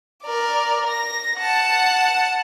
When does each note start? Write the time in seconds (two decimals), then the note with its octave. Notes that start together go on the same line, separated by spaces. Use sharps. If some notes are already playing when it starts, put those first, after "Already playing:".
0.24 A#4 D5
0.88 A#6
1.39 F#5 A5